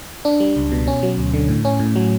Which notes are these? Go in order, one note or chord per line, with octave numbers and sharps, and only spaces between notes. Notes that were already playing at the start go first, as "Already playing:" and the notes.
D4
G3
C#2
B2
C#4
F#3
D2
D3
A2
C#4
A2
F#3